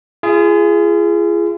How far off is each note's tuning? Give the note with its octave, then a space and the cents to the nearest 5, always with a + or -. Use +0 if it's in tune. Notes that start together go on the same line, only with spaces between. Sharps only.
F4 -40 G#4 +0